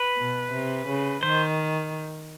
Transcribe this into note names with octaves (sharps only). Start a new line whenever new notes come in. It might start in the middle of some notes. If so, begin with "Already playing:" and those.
Already playing: B4
B2
C3
C#3
D#3 C5